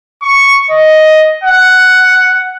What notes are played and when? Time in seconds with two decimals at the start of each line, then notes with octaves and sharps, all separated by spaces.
0.22 C#6
0.71 D#5
1.44 F#5